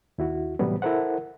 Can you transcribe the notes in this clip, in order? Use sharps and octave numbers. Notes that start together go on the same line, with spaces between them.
D#2 E4 F#4
A2 C3 E3 F#3 G3 B3
E4 A4 A#4 C5 F#5